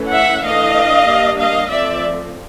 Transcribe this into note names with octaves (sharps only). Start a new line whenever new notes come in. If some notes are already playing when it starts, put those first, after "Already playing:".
Already playing: E3 A3 C#4
E5 F#5
E3 A3 D4 D#5 F5
G3 A#3 D4
D#5 F5
F3 A3 C4 D5 E5